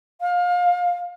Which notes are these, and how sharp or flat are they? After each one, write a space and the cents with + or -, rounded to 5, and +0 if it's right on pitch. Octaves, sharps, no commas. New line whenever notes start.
F5 +25